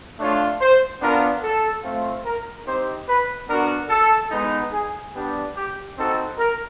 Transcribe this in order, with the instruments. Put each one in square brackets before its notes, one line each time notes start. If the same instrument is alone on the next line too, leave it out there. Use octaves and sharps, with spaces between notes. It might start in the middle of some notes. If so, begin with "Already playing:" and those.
[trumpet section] A3 D4 F4 C#5
C5
B3 D4 F4 A#4
A4
A3 C4 F4
A#4
C4 D#4 G4 C5
B4
B3 D4 F#4 A#4
A4
G#3 B3 D#4
G#4
G3 B3 D4 G4
G4
C4 D#4 F#4 A4
A#4